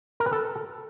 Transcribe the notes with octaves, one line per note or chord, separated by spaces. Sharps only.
A#4
B4
A4